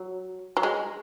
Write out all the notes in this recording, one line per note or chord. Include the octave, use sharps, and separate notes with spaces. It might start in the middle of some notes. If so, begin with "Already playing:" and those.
Already playing: F#3
F#3
G#3